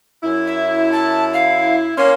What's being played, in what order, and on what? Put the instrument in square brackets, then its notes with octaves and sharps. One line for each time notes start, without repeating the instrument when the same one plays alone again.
[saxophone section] F#2 E4
[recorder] E5
A5
F5
[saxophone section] A#3 C#4 [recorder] C6